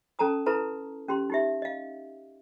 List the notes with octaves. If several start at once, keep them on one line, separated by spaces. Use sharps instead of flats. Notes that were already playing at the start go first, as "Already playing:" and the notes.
C#4 A4 A5 A#5 D#6
E4 A4 B4 A5 A#5 C6
C#4 G4 C6
D#4 G4 E5
D#5 F5